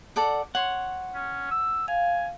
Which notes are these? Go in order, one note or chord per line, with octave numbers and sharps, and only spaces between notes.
A4 D5 F#5
C#5 F#5 C6
C#4
E6
F5 G#5